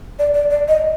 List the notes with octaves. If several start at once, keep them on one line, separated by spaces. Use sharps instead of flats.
D5
D5
D5
D#5